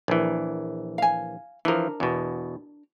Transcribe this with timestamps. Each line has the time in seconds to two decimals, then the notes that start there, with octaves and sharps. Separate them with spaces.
0.08 A#1 E3
0.98 F5 G#5
1.65 E3 F3 D4 A#4
2.00 E2 B2